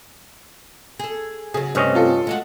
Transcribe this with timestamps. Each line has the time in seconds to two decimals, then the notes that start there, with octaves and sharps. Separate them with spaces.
0.99 G#4 A4
1.54 C#3 F#3 G#4
1.75 G2 C3 A3 C4 C#4 D#5
1.95 F4 A4
2.27 G#3 A3 F#4